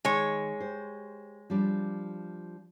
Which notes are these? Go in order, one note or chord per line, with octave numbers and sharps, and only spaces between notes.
D#3 G#3 C#5
G4 C5
F3 G3 D4